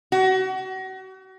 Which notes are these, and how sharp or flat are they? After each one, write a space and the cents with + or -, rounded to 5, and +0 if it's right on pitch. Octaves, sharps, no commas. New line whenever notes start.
F#4 +35